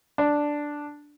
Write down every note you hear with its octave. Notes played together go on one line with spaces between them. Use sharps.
D4